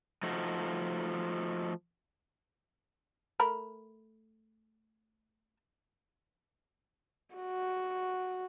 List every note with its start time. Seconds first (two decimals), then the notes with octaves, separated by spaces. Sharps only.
0.23 F3 A3 D#4 F#4
3.40 A3 A#4 B5
7.35 F#4